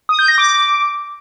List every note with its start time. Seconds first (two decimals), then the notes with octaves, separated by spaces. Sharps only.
0.09 D#6
0.19 G6
0.28 A#6
0.38 D6